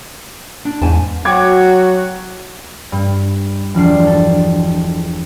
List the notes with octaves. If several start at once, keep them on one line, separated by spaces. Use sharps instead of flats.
D4
E2 G#2 G#5 A5
F#3 F#4 G5 D6 G#6
G2
E1 F3 D4 C7
A4